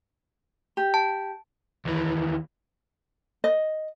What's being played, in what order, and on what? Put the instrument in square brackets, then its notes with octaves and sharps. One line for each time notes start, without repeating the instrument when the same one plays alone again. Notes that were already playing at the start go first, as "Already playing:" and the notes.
[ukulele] G4
[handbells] A5
[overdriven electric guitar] D#2 E3
[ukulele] D#5